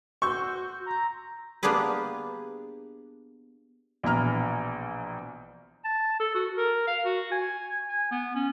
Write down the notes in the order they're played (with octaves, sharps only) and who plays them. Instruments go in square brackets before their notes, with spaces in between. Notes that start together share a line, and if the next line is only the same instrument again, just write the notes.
[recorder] F#4 [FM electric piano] C6 E6 G6 [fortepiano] C#6
[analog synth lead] A#5
[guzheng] A#3 B3 D4 G4 G#4 B4
[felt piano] A#1 B2 E3 A#5 F6
[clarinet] A5
A4
F#4
A#4
F5
F#4
G#5
G#5
B3
C#4